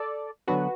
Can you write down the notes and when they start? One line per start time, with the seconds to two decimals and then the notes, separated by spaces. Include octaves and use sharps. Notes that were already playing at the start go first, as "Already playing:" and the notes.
Already playing: A4 D5
0.48 D3 F#3 B3 D4 F#4 B4